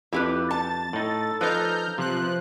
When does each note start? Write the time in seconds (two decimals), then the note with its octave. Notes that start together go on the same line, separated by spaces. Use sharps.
0.13 F2 E4 G4 B4
0.51 A5 A6
0.93 A2 D#4 A4
1.41 F3 D#4 B4 A#5 F6 G6
1.98 C3 F3 C5 F#6